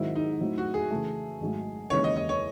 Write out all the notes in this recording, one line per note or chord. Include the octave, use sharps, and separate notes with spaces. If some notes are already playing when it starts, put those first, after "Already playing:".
Already playing: G#2 D#3 F#3 C4 E4
D#4
A2 F#3 C4 E4
F#4
G#4
C#3 E3 A3
G#1 G#2 F#3 A3
D#2 C#3 E3 G#3 C#4 C#5
D#5
D#5
C#5